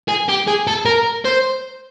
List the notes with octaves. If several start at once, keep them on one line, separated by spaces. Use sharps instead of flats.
G#4
G4
G#4
A4
A#4
C5